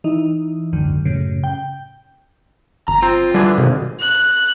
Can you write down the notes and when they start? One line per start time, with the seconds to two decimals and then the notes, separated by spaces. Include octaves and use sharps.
0.04 E3 D#4 E4
0.73 G#1 C#2 F#2 D3
1.05 F#2 A2 C#3
1.44 G5
2.88 G1 A#5
3.03 C4 F4
3.34 D3 E3 G3 G#4
3.58 G#1 C3
4.00 F#6